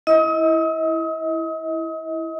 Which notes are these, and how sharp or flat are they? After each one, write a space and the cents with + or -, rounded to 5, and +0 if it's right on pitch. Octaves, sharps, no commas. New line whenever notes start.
E4 +0 D#5 +35 D#6 +35